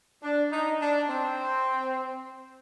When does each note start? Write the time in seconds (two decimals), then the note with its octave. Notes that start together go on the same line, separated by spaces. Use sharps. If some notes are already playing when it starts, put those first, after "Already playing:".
0.23 D4
0.52 D#4
0.81 D4
1.09 C4